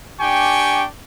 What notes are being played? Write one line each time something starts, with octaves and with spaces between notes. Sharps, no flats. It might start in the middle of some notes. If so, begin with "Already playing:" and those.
D4 G4 G5 G#5 C#6